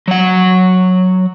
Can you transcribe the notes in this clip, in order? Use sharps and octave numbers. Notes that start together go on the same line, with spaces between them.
F#3 F#5